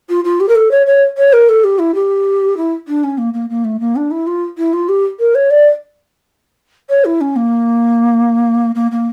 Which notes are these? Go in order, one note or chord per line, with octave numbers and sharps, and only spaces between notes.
F4
F4
G4
A#4
A4
C#5
C#5
C#5
A#4
A4
G4
E4
G4
E4
D4
C#4
A#3
A#3
A#3
A3
A#3
D4
E4
F4
E4
F4
G4
A#4
C#5
D5
C#5
E4
C#4
A#3
A#3
A#3